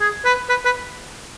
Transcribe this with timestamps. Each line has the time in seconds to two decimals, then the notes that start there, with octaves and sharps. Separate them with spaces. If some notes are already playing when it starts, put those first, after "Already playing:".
0.01 G#4
0.25 B4
0.49 B4
0.65 B4